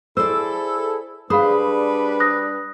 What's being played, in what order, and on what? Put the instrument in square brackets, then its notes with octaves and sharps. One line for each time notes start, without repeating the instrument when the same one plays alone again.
[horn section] E4 G#4 A4 [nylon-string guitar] C5 D5 [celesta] E6
[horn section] G3 D4 B4 [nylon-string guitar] G#4 C5 [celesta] F5 B5 D#6
[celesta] D#6 F#6 A#6